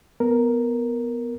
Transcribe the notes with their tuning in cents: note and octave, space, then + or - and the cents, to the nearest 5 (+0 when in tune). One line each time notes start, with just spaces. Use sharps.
B3 +0 A#4 +0